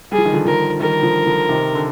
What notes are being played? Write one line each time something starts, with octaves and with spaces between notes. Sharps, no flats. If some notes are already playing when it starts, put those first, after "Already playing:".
G3 G#4
F3
D#3
D3 F3
D3 F3 A#4
D#3 G3 A#4
D3 F3
D3 F3
C3 D#3
D3